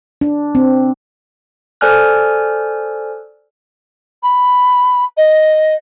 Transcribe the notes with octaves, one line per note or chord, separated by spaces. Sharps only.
D4
C4
A4 C5 D5 G#5 F6 F#6
B5
D#5